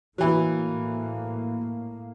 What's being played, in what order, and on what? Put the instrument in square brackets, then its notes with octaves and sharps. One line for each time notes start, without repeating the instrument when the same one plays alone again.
[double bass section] A2 A#3 [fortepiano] E3 F#3